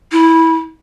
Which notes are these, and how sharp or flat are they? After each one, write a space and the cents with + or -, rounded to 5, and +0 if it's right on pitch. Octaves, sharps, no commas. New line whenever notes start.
E4 -15